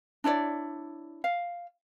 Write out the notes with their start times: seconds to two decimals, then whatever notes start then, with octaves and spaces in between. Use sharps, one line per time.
0.24 D4 E4 C#5 D5
1.24 F5